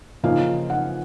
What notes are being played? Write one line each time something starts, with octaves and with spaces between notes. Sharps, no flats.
C#3 F3 A#3 D#4 F5
F#5